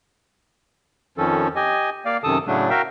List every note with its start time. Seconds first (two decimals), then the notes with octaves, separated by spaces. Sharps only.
1.18 F2 D#3 F3 C#4 A4
1.56 G4 D#5 G#5
2.06 A#3 D5 F5
2.24 F#2 C3 D#3 A4 A5 D#6
2.47 A2 C#3 F#3 A3 D4
2.70 F#4 A#4 E5 F5 G5